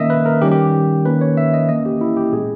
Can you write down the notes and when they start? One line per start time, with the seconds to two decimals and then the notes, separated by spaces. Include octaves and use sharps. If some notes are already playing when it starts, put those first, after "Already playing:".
Already playing: D#3 A#3 C#4 D#5 E5
0.10 B4
0.26 A#4
0.42 D#3 G3 C#4 G4
0.52 G4
1.05 D#3 A#3 C#4 B4
1.21 C#5
1.37 E5
1.54 D#5
1.69 E3 A#3 C#4 D#5
1.86 G4
2.01 E4
2.17 G4
2.33 A#2 G#3 B3 G#4